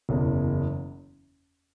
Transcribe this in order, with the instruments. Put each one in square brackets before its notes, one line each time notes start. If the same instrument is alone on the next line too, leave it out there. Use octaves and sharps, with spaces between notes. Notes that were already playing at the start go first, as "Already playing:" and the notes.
[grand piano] F#1 E2 C#3